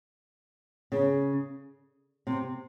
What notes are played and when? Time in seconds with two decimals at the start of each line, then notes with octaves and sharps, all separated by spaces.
0.92 C#3
2.27 C3